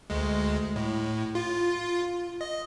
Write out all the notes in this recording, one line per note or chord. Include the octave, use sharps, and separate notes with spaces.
D2 G#3
A2
F4
D#5